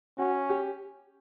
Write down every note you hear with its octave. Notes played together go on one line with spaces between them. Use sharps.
C#4 F#4
G4